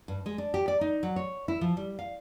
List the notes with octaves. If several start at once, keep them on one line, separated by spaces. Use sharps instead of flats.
G2
G#3
D4
G4
D5
D#4
F#3
C#5
E4
F3
G3
F5